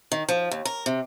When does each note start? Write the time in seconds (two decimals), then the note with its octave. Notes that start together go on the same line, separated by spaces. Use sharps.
0.12 D#3
0.29 F3
0.51 D#2
0.65 A#4
0.86 C3